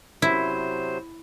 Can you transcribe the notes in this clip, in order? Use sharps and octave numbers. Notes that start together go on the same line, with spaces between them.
C3 F#3 E4 C5